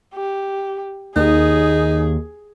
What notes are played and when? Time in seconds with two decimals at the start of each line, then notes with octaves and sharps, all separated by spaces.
0.15 G4
1.16 D#2 D#4 G#4